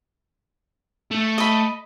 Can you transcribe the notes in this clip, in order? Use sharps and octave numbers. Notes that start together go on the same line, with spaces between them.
A3
D#5 B5